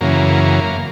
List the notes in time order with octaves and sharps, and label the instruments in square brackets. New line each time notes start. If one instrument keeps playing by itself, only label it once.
[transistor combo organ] F#2 C#3 E3 A#3